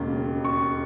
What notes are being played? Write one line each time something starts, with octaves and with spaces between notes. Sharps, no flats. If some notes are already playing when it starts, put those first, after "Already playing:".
Already playing: E1 D#2 C#3
C#6